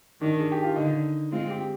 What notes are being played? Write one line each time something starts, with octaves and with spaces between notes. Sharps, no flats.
D#3 D4
G#4
G4
F4
D3 D#4
G#3 C4 F4
G4